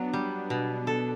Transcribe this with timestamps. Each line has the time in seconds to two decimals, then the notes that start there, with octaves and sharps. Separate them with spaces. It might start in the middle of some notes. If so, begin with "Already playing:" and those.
Already playing: F#3 B3 D4
0.13 G3
0.50 B2
0.87 A4